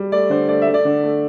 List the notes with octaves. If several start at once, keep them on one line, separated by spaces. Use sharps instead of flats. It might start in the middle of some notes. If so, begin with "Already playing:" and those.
Already playing: G3
A3 D5
D3 C5
A3 D5
E5
A3
D5
D3
A3